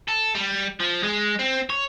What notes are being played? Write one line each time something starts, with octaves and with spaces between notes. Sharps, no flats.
A4
G3
F3
G#3
C4
C#5